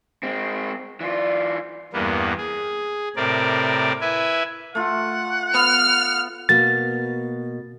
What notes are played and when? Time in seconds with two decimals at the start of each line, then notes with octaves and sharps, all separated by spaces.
0.23 G#3 C4
1.01 E3 F4 D5
1.93 E2 G2 A#3 B3
2.38 G#4
3.16 A2 C3 C4 A#4 D5
4.01 E4 B4 E5 G#5
4.75 A3 F4 F#5
5.54 B3 F6
6.49 B2 A#3 A6